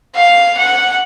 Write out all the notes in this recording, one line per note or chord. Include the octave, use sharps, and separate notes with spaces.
F5
F#5